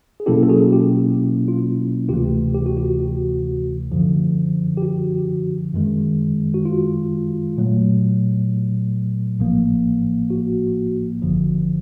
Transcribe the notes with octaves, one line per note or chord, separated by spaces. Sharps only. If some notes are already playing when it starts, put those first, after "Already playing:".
G#4
B2 F#3 A#3 C#4 E4 G4 A4
A4
F#4 G#4
F4 G4
F4
D2 C3 E3 A3 F4 G4
G4
F#4
F4 G4
F#4
F#2 D3 F3
G4
F#4
F#2 D#3 G#3
F#4
F4
A#2 F#3 A3
A1 A2 F3 A#3
F#4
G1 F#2 D3 F3